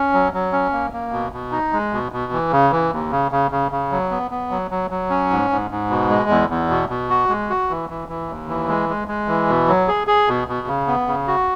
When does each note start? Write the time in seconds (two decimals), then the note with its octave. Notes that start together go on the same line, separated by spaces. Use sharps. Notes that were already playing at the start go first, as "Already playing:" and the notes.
Already playing: C#4
0.13 F#3
0.34 F#3
0.53 C#4
0.72 A#3
0.93 A#3
1.12 B2
1.32 B2
1.52 D#4
1.73 G#3
1.93 B2
2.12 B2
2.32 E3
2.52 C#3
2.71 E3
2.92 D#2
3.11 C#3
3.32 C#3
3.51 C#3
3.72 C#3
3.92 F#3
4.11 B3
4.31 B3
4.51 F#3
4.71 F#3
4.90 F#3
5.10 C#4
5.30 G#2
5.50 G#2
5.71 G#2
5.90 B2
6.10 G#3
6.30 E2
6.50 E2
6.69 B2
6.89 B2
7.10 F#4
7.29 G#3
7.49 F#4
7.70 E3
7.90 E3
8.08 E3
8.29 D#2
8.49 E3
8.68 G#3
8.89 G#3
9.08 G#3
9.28 E3
9.48 B2
9.68 F#3
9.88 G#4
10.07 G#4
10.28 B2
10.48 B2
10.67 C#3
10.87 B3
11.07 C#3
11.27 F#4